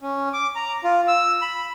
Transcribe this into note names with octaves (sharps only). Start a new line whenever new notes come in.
C#4
D6
A#5
F4
E6
B5